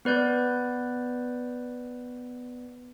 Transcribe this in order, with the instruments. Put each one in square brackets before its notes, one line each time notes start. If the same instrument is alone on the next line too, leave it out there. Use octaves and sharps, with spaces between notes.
[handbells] B3 B4 D5 G6